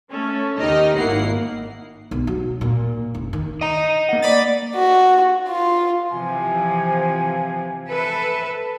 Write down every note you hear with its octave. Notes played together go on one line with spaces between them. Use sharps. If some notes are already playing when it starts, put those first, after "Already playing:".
A3 C#4 A4
D#2 D#3 D#4 G4 D#5 F6
G#1 G#2 A#3 E4 F#5 C7
B1
F#3
A#2
F#1
D#3
D#5 A#5
A#3 F#5
D5 B5 A6
F#4
F4
C3 E3 F3 G#5
A4 B4 E5